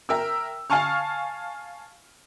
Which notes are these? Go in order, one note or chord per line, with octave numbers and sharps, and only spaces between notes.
A#4 E5 G5 E6
F5 G#5 A5 C#6 F6